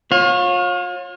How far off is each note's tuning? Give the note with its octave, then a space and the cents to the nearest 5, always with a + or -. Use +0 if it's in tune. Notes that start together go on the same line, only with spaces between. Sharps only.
F4 +35 C#5 -25 F5 +35